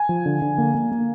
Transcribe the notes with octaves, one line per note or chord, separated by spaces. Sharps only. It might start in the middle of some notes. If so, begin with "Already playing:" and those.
Already playing: G#5
F3
D3
D3
A#3
A#3
A#3